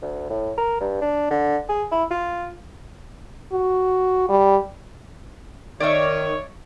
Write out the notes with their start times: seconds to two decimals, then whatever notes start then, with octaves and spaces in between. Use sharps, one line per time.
0.02 D2
0.30 A2
0.58 A#4
0.81 G2
1.01 D4
1.30 D3
1.69 G#4
1.92 E4
2.11 F4
3.52 F#4
4.29 G3
5.80 D#3 C#5 D5 E5